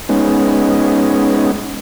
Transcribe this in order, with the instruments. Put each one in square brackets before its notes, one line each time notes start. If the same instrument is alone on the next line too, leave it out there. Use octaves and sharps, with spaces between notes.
[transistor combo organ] G#3 B3 C#4 D#4